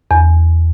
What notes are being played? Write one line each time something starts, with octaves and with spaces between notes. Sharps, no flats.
E2